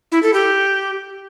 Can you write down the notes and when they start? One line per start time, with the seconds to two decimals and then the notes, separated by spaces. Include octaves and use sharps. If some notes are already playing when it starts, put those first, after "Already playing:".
0.12 E4
0.23 A4
0.34 G4